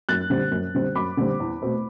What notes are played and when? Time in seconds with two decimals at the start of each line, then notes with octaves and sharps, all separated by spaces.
0.09 F#2 F#6 A6
0.30 D3 G3 C4
0.52 F#2
0.74 D3 G3 C4
0.95 F#2 B5 D6
1.17 D3 G3 C4
1.40 E2
1.62 B2 A3 C4